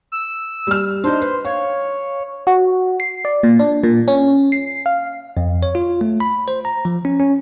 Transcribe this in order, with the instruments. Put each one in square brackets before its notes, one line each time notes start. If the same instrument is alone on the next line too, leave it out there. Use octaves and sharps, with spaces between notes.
[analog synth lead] E6
[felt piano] G3 F6
[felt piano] D4 D#4 [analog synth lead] C5
[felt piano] B4
[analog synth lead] C#5 [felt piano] F5
[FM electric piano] F#4
C7
D5
A#2
D4
A#2
C#4
C7
F5
[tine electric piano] F2
C#5
F4
A3
B5
C5
A#5
F3
C#4
C#4